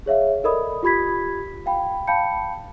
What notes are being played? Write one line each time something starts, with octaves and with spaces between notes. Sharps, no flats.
G#4 C#5 E5 F5
A4 A#4 D5 D#5 B5 D#6
F4 G4 B5 G#6 B6
F5 G5 B5
F5 G5 A5 B5 G6 C#7